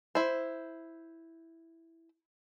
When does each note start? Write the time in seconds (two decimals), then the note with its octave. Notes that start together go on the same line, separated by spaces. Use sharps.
0.15 E4 C5